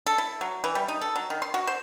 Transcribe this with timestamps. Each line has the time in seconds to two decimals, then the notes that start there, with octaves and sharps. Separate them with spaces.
0.07 A4
0.18 E4
0.41 F#3
0.64 E3
0.75 G3
0.88 D#4
1.01 A4
1.16 F#3
1.30 D#3
1.42 C6
1.54 F#4
1.67 C5